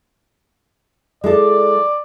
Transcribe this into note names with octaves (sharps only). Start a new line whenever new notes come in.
G#3 E4 A4 D5